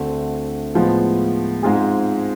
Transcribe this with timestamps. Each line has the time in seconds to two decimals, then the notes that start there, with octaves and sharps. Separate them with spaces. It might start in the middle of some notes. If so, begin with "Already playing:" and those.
Already playing: D2 D3 A3 C4
0.75 A2 F3 G#3 B3 F4
1.63 G#2 G#3 C4 F4 G#4